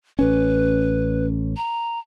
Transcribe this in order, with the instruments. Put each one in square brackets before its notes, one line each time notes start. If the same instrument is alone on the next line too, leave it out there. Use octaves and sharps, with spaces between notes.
[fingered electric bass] A1 C#4 [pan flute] B4
[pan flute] A#5